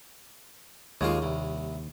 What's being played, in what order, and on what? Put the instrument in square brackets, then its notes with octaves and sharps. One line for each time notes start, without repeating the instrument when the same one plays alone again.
[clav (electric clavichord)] D#2 C#5 [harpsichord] G#3 A#3 F4
[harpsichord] C2